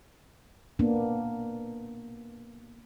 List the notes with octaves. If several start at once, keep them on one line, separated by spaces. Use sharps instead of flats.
A#3 B3 D4